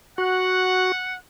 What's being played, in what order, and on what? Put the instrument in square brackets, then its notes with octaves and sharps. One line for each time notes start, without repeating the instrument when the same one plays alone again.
[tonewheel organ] F#4 [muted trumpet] F#5